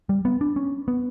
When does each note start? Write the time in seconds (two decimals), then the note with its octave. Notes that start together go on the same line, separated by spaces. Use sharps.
0.09 G3
0.25 B3
0.41 D4
0.56 C#4
0.88 B3